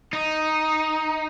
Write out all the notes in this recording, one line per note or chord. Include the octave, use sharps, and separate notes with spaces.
D#4